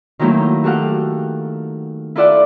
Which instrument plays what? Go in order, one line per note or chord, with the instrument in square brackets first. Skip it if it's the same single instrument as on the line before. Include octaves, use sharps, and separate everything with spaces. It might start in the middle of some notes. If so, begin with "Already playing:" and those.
[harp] D#3 F3 F#3 A3 A#3 E4
F#4 G4 A4 F5 F#5
E4 F4 A4 D5 E5 F#5